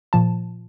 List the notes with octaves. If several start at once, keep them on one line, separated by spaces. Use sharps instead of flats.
A#2 F3 A5